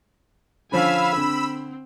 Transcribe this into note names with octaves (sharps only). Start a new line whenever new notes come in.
D3 F3 C#4 F5 G#5 B5 E6
D3 C4